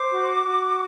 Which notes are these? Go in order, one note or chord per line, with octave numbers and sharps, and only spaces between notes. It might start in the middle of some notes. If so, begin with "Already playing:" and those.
Already playing: C5 D6
F#4
F#4